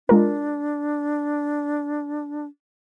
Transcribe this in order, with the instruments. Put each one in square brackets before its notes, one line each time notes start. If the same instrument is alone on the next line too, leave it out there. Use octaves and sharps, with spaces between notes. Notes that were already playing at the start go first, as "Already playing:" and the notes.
[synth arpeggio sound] G#3 F4 A#4 [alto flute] D4